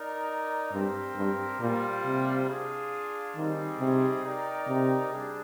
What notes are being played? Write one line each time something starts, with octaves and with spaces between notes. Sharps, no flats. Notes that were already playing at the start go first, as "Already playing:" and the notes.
Already playing: D#4 A#4 D5
G2 C4 G4 A#4
G2
A#2 G3 A#3 F4 C5
C3
D4 F4 G#4
D#3 G3 C4 D#4 G#4
C3
D#4 A#4 D5 G5
C3
G3 D4 G#4